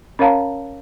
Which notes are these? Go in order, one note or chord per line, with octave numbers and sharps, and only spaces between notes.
C#4 A#4 C#5 F5 A5 A#5